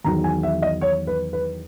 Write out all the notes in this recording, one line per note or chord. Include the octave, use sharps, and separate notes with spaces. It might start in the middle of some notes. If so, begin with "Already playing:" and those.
E2 D#3 F#3 A#5
G#5
E5
D#5
C#5
B4
B4